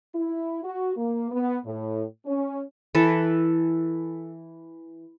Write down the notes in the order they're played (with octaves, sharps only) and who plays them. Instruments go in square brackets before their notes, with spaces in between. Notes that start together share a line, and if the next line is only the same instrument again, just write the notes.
[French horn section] E4
F#4
A#3
B3
A2
C#4
[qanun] E3 A4 B4